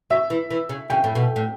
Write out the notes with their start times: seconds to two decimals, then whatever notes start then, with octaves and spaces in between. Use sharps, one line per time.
0.10 F#3 E5
0.30 E3
0.51 E3
0.69 C#3
0.90 C#3 G5
1.04 A2
1.15 B2
1.36 A2